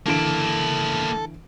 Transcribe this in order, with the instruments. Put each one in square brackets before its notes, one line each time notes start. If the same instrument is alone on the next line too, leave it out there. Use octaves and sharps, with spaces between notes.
[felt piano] D3 E3 D7 [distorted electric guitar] A#3 E4 [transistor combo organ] A4